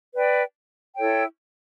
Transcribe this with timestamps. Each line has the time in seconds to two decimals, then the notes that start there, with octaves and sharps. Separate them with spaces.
0.15 B4 D5 G5
0.95 E4 A4 C#5 G5